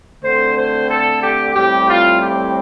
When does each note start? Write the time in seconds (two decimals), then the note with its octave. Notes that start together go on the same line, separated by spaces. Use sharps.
0.23 D3 A3 C4 C5
0.57 C5
0.90 A4
1.22 G4
1.55 A2 G3 C4 G4
1.89 F4
2.21 G4